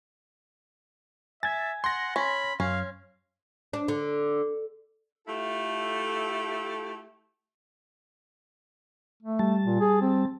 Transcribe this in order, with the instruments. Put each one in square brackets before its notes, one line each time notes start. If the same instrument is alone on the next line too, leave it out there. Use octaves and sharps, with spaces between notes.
[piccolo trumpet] E5 [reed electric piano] G#5 G#6 [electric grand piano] A6
[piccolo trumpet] F#5 [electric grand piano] C6 A#6
[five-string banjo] C#4 [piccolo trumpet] B5
[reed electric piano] F#2 [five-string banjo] C#4 [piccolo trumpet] F5
[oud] D4
D3
[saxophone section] A3 E4 F4 G4 A4
[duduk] A3
[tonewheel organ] G3 A5
[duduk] A#2
G#4
C4